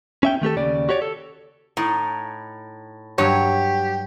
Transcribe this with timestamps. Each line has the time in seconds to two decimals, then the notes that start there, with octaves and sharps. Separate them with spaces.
0.23 C#4 E5 G5
0.42 D#3 A3 G4 A4
0.57 D#2 C#3 D5
0.89 F#4 G4 C#5 D5
1.02 A4
1.77 A2 D#4
3.18 G2 F#3 G4 C#5